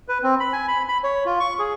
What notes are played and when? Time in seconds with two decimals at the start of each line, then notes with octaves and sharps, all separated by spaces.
0.08 B4
0.23 C4
0.40 B5
0.53 G#5
0.68 B5
0.88 B5
1.04 C#5
1.25 F4
1.40 C#6
1.59 G#4